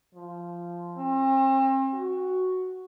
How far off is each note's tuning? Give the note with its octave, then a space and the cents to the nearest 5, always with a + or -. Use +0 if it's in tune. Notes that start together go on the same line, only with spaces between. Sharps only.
F3 -10
C4 +40
F#4 +0